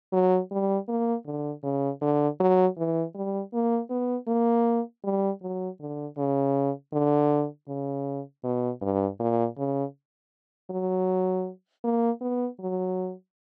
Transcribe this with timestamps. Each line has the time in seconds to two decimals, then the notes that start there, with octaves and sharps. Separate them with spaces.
0.13 F#3
0.51 G3
0.88 A#3
1.26 D3
1.63 C#3
2.02 D3
2.40 F#3
2.77 E3
3.15 G3
3.53 A#3
3.90 B3
4.28 A#3
5.04 G3
5.42 F#3
5.80 D3
6.18 C#3
6.93 D3
7.68 C#3
8.44 B2
8.82 G2
9.19 A#2
9.58 C#3
10.70 F#3
11.84 A#3
12.21 B3
12.60 F#3